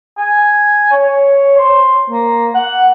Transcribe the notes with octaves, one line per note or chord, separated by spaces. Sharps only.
G#5
C#5
C5
A#3
F#5